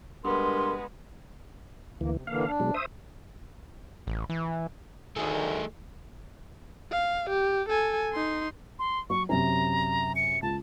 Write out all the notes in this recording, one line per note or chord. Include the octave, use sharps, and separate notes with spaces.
G2 G#3 B3 A#4 C6
D2 E3 A#3
C3
D3 E3 A#3 F5
D4
B2 F#3 G#3
C5 E5 D#6
A1
E3
D2 D#3 A3 G#4
F5
G4
A4 G#5
D#4 C6
C6
F#3 C#6
F#2 C3 C#4 A#5
C#7
C#2 A5